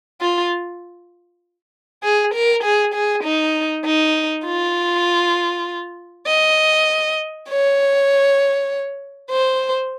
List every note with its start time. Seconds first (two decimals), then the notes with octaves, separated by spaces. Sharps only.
0.21 F4
2.03 G#4
2.34 A#4
2.64 G#4
2.94 G#4
3.24 D#4
3.85 D#4
4.45 F4
6.27 D#5
7.49 C#5
9.30 C5